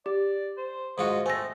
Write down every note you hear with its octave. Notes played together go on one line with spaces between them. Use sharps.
G4 D5
C5
G#2 F4 F#4 D#5
A3 C4 G#5 A#6